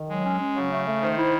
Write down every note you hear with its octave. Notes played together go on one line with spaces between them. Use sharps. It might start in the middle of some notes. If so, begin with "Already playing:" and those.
Already playing: D#3
F#3 G#3
C#4
C#4
C#3 F#3
A3
A3
D#3 C5
E4